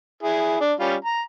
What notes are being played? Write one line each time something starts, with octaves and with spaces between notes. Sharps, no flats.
E4 G#4
D4
G3 C#4 F4
A#5